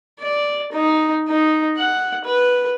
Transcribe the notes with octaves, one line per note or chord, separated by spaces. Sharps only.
D5
D#4
D#4
F#5
B4